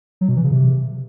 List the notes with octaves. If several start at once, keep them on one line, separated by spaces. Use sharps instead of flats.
F#3
B2
E3
C#3
C3